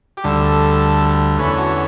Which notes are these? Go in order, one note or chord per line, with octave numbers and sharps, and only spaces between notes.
G4
D2 D3 G3 A4
E2 D3 A3 C#4 B4
F#4